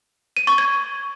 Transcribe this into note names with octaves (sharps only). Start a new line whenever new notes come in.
D#7
C#6
G#6